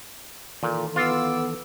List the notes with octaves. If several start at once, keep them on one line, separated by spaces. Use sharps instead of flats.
A#2 D#3 E3 A4
B3 F4 D6 E6